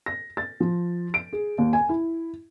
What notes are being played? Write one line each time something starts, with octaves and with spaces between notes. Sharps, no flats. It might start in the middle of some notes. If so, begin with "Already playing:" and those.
A#6
A6
F3
D7
G#4
D#2
G#5
E4